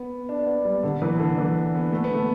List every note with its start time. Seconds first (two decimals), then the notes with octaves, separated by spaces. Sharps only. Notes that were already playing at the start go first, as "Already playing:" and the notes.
Already playing: B3
0.29 D4
0.39 D4
0.46 B3
0.65 G3
0.83 D3
1.02 E3
1.19 D3
1.38 E3
1.75 B3
1.92 A3
2.04 B3
2.15 A3